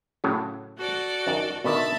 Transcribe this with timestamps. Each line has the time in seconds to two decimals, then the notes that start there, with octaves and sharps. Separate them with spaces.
0.24 A2 C#3 F#3
0.76 F#4 A4 D5
1.27 F#2 D#3
1.64 B2 D3 D#3 E5 A5 B5